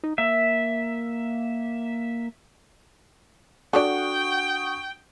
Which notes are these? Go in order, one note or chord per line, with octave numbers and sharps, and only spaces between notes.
D#4
A#3 E5
D4 F#4 A4 D5 F#5 G5 C#6 D#6